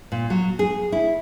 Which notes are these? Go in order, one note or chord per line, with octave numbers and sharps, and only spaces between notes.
A#2
F#3
G#4
E4